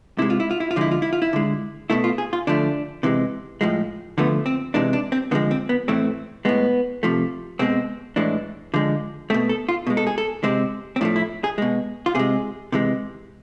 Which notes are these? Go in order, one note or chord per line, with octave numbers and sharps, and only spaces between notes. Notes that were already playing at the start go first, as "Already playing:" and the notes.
C3 G#3 E4
F4
E4
F4
E4
F4
D3 F3 G#3 E4
F4
E4
F4
E4
D3 G#3
B2 A3 E4
F4
G#4
F4
D3 F3 A3 D4
C3 E3 G#3
A2 F3 G#3
D3 F3 A3 B3
C4
C3 E3 G#3 D4
D4
C4
D3 F3 G#3 B3
C4
B3
A2 E3 A3 C4
A2 G#3 B3
C3 F3 A3
B2 G#3 C4
A2 E3 G#3 D4
D3 F3 G#3
B2 A3 C4
A4
F4
B2 G#3
A4
G#4
A4
C3 G#3 C4
C4
A2 F3 A3 D4
E4
G#4
B2 G#3
F4
C3 G#3 G#4
C3 E3 G#3